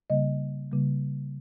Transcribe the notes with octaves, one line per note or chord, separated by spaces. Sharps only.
C#3 G3 A#3 D#5
C#3 G3 A#3